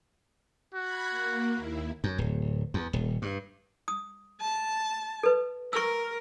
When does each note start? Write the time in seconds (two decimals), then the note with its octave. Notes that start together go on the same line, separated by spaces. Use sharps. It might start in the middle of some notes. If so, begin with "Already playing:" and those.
0.74 F#4 B5 F#6 G#6
1.10 A#3
1.54 D#2 E4
2.04 F#2
2.18 D1
2.74 E2
2.93 D#1
3.22 G2
3.88 D#6
4.41 A5
5.23 A4 B4
5.73 A#4 C#6 E6